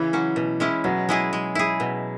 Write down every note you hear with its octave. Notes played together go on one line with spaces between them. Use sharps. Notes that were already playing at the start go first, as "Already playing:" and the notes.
Already playing: C#3 E3 E4 G#4
F#3 C#4
B2
G#3 C#4 E4
B2 F#3
G#3 E4 G#4
G#3
E4 G#4
B2